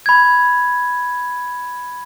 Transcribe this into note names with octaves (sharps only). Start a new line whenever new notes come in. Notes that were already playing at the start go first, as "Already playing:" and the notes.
B5 G#6